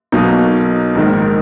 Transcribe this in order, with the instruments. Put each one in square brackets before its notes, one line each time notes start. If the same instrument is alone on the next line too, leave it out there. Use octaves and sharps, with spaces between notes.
[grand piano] B1 B2 F#3 A#3 D#4
A#1 G#2 D#3